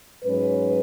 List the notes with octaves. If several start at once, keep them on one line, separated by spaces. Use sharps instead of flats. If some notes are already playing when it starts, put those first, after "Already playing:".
G#2 F#3 C#4 B4